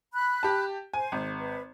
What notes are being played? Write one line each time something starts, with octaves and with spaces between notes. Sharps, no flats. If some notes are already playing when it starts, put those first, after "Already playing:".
B5 F#6
G4 A5
C5 G#5
G#1
B4